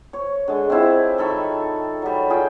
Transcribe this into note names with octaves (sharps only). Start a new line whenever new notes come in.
C#5
D3 G#3
C4 D4 E4 F4
D#3 A4 B5 C#6
F#3 G3
F4 G#4 G5 B5